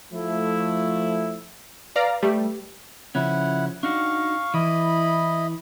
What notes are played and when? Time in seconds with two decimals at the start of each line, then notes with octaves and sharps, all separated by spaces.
0.13 F3 A3 E4
1.96 B4 D5 F5 A#5
2.23 G3 A3 G4
3.15 C#3 F3 C#4 E4 F#5
3.83 D4 D#4 F#4 F5 C#6
4.54 E3 E4 D#5 B5